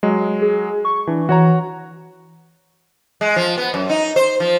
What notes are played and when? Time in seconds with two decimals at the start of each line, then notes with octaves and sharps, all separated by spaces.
0.03 F#3 G#3
0.42 G#4
0.85 C#6
1.07 E3 D4
1.29 E3 F#4 C#5 A#5
3.21 G#3
3.36 F3
3.58 B3
3.74 F#2
3.89 D#4
4.16 C5
4.40 F3